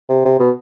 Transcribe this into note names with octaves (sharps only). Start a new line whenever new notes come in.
C3
C3
B2